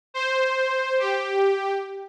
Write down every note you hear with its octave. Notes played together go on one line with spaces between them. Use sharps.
C5
G4